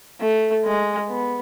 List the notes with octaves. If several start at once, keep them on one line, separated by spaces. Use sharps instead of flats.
A3
G#3
B3